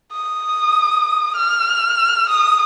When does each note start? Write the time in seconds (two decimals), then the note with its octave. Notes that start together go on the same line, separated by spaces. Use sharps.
0.12 D#6
1.36 F6
2.30 D#6